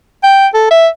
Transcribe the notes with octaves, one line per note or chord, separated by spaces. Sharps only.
G5
A4
E5